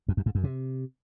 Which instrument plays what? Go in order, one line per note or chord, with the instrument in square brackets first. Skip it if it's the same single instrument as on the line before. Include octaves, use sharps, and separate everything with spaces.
[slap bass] F2
F#2
G#2
F#2
C3